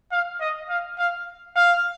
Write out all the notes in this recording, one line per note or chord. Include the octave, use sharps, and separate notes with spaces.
F5
D#5
F5
F5
F5